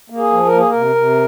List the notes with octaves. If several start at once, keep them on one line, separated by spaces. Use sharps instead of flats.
A#3
G#4
F3
A#4
A#3
G#4
C3 A#4
C3